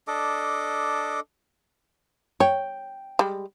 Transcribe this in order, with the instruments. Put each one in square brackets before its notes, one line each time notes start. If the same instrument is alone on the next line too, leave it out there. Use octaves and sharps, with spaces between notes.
[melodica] D4 A4 D#5 D6
[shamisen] C#5 [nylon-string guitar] G5
[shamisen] G3 G#3